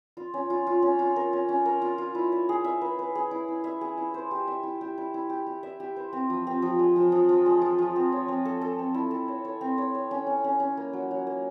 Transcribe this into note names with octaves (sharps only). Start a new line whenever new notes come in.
F4
C#4
F4
F4
C#4
F4
A#4
C#4
C#4
A#4
F4
F4
E4
E5
G#4
E5
B4
B4
G#4
E4
E4
E5
G#4
E4
C5
G4
E5
E4
G4
E4
E4
G4
G4
E5
G4
C5
C4
F3
C4
F3
G#3
F3
F3
F3
G#3
F3
F3
C4
C#5
C4
A4
A4
C4
E4
A4
C#5
C#5
C4
C#5
C#5
C#4
C#4
C#4
C#4
A#3
F#3
F#3
A#3